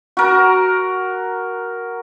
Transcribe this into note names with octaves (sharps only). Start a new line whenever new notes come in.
F#4 A#4